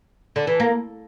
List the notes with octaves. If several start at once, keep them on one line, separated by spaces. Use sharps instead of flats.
D3
E3
A#3